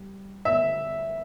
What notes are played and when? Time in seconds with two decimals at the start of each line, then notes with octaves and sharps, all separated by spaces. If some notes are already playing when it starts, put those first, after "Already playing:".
Already playing: G3
0.45 E5